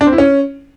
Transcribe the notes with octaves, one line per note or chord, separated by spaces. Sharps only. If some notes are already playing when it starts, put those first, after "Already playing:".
D4
C4
E4
C#4